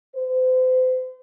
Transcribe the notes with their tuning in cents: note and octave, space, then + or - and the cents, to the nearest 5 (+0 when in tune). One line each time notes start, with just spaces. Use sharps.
C5 -35